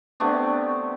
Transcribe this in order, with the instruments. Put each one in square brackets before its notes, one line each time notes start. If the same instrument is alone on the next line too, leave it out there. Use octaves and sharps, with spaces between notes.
[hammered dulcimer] C3 A3 B3 D4